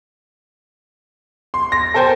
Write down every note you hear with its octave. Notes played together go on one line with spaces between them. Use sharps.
C6
A#6
A4 A#4 C5 G5 G#5